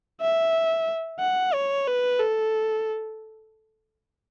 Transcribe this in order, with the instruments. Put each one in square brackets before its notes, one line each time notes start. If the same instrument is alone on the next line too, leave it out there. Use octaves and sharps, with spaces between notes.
[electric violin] E5
F#5
C#5
B4
A4